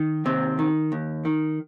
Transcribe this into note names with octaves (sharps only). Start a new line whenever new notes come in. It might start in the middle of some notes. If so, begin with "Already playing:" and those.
Already playing: D#3
D#2 C3 C4
D#3
D#2
D#3